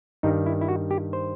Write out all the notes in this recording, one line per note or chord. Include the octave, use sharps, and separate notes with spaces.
G2 D#3 G3 D#4
E4
E4
F#4
G4
C5